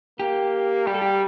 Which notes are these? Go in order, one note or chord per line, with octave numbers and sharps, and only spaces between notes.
A#3 G4
G3 G4
A4
G4